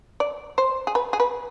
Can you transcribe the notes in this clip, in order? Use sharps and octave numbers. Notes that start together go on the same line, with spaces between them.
D5
C5
G#4
B4
G#4
B4